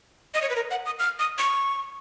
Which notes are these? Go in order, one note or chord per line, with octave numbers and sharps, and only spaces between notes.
D#5
C#5
B4
A#4
F#5
D#6
F6
D#6
C#6